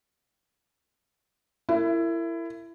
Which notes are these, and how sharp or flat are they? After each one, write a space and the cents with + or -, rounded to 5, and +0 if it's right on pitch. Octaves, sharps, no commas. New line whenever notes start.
E4 +20 A#4 -35